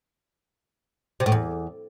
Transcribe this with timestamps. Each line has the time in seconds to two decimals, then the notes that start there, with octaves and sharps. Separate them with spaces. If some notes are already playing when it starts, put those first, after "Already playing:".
1.20 C3
1.26 A2
1.32 E2